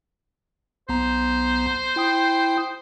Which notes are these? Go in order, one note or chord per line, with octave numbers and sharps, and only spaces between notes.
B1 B3 C5 A#5
E4 G5 D#6